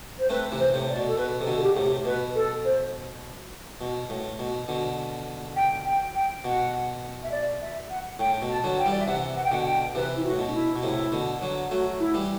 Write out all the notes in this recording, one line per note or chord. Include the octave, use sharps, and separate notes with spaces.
C5
A3 C4 B4
C3 E3
C5
A2 C3
D5
B2
A4
B2 B4
C3 A4
B2 D3
A4
G4
A2 C3
G4
B2 B4
A4
C5
B2
A2
B2
B2 D3
G5
G5
G5
B2 F#5
E5
D5
E5
F#5
A2 G5
B2
A5
D3 F#3
G5
E3 G3
D5
E5
C3 E3 F#5
F#5
G5
B2 D3 F#5
G5
C3 E3 B4
E4
F#4
A2
B2
D4
E4
B2
A2 C3 E4
B2 D3
D3 F#3
F#3 A3 F#4
E4
E3 G3